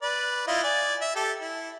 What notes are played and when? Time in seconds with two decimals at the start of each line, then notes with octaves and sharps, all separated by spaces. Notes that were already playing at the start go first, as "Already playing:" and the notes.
0.02 B4 D5
0.47 E4 F4 D#5
0.64 D5 G#5
1.01 E5
1.15 G4 A4
1.41 E4